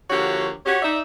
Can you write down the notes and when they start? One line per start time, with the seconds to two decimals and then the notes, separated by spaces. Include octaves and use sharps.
0.10 D3 F3 A#3 F#4 G4 C#5
0.66 F#4 G4 C#5
0.83 D#4 D5 E5